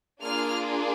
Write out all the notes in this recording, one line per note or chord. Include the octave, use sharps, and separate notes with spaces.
A#3 D4 F4 G#4 F6